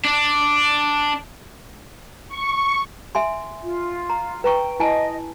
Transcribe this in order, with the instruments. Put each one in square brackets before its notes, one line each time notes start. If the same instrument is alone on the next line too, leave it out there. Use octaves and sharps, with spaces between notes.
[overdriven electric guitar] D4
[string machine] C#6
[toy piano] E5 G#5 C6
[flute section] F4
[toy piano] A#5
[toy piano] B4 A#5 C#6 [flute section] G5
[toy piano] E4 G#5 A5 [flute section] D#5